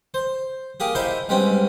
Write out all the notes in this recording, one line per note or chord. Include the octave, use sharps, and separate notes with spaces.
C5
A#3 G4 G#4
D#4 E4 C5 E5 F5
B1 G#2 G3 C4 C#4